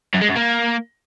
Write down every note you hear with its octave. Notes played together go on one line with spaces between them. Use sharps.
F#2
G#3
F#2
A#3